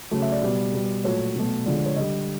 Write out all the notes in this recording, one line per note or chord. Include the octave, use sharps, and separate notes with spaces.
C#3 F#3 A3
E5
D5
B2 G3
B2 G3
A#2 F#3 A3 C#5
B2 F#3 A3
D3 F3 G#3 D5
D5
C#5
D3 G3 D#5